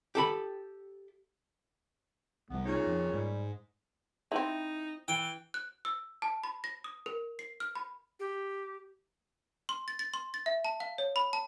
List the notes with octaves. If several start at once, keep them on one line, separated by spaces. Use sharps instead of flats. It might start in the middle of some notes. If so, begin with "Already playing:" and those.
G4 A4 B5
C2 G3 B3
A#2 C#3 D#4 C#5
F2
G#2 G3
C4 D#4 E4
E3 G5
F#6
E6
A5
B5
A#6
D#6
A#4
C7
F6
B5
G4
C6
A6
A6
C6
A6
E5
A5
F5
C#5
B5
A5